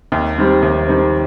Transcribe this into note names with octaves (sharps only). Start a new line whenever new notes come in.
D#2
D#3 G3 C4
D#2
D#3 G3 C4